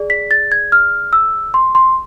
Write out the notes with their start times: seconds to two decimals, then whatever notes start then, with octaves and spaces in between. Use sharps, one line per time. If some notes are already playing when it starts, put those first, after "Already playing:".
Already playing: G#4 D5
0.10 B6
0.31 A6
0.52 G#6
0.72 F6
1.13 E6
1.54 C6
1.75 C6